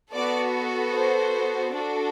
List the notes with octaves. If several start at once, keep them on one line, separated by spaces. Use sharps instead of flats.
B3 F#4 A4 D5
C5
D4 F#4 A4